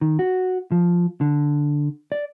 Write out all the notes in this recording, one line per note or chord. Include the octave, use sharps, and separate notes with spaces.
D#3
F#4
F3
D3
D5